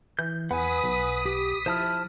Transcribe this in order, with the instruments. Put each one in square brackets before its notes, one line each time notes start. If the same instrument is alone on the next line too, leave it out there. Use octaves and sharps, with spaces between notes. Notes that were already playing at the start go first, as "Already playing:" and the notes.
[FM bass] E3 [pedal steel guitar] G6
[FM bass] E2 [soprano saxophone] B4 [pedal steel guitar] F#5 G#5 [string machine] D#6 B6
[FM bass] B1
[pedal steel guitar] G4
[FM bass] F3 [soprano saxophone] E4 [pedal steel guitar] C5 A5 F6